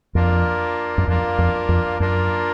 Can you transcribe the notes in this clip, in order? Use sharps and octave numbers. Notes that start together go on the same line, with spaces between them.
F2 A#3 D4 F4 A#4
F#2
F2 A#3 D4 F4 A#4
F2
F2
F#2 A#3 D4 F4 A#4